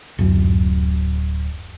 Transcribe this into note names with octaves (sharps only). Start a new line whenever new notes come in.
D1 F#2